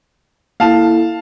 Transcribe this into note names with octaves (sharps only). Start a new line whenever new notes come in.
A#3 E4 A4 F5 A5